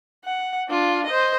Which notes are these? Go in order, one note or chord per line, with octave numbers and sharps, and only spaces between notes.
F#5
D4 F4
C5 D#5